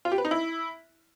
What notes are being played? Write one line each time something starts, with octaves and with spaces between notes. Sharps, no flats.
F4
G4
B4
D#4
E4